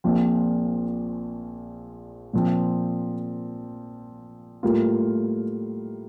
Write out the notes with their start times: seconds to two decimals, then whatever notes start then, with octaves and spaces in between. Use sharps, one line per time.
0.04 A#1 A#2 F3 C4
2.33 A#2 F3 C4
4.63 A2 G3 A#3 F4